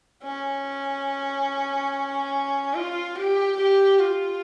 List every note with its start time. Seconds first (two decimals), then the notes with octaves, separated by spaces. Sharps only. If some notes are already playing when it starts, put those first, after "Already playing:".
0.23 C#4
2.74 F4
3.16 G4
3.57 G4
3.99 F4